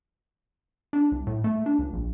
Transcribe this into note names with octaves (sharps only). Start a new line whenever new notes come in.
D4
C2
A2
A3
D4
C#2
A#1